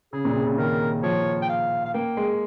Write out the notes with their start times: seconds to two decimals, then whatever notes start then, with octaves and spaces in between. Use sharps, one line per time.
0.13 C#3 G#4
0.25 A#2
0.36 C3
0.47 C#3
0.58 D#3 A#4
1.03 F3 C#5
1.42 G5
1.49 F5
1.85 F5
1.94 A#3 G5
2.17 G#3